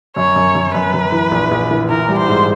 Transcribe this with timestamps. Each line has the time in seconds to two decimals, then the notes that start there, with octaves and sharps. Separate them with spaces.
0.16 F#2 C#5
0.36 F#2
0.55 F#2
0.74 F#2 B4
0.94 F#2
1.12 E3
1.31 A#1
1.51 A#1
1.71 E3
1.90 E3 A#4
2.08 G3
2.18 C5
2.28 G#2